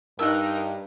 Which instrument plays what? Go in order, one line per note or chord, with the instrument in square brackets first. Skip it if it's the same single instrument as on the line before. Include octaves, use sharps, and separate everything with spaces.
[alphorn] G2 [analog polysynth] D#4 A#4 [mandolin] E6 F#6